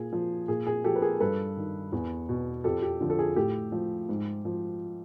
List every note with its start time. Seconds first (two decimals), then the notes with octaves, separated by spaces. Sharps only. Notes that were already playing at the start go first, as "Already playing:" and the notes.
Already playing: A#2 G#4
0.13 F3
0.48 A#2 G#4
0.67 G#4
0.84 F3 G4 A4
0.96 B4
1.02 G#4 A#4
1.20 G2 A4 B4
1.57 D#3
1.92 E2
2.29 B2
2.64 F2 G4 A4
2.82 G4
3.01 D3 F3
3.10 A4
3.19 G#4
3.36 A2 G4 A4
3.72 F3
4.09 G#2
4.45 F3